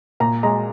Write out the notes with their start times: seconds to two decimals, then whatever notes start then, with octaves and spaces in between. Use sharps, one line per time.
0.20 A#2 A#5
0.43 G#3 A#5